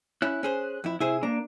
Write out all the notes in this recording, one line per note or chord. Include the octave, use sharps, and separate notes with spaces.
C#4 E4 F#6
C#4 G#4 C5
F2 E4
C3 E4 G#4 C5
A#3 D4 A#5